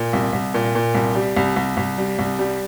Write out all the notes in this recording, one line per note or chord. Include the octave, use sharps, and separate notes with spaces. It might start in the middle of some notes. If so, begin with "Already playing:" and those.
Already playing: A#2
C2
C2
A#2
A#2
C2
G3
C2
C2
C2
G3
C2
G3